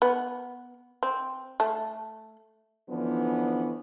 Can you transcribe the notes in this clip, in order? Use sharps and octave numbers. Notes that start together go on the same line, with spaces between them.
B3
C4
A3
D3 E3 F3 B3 C#4 D4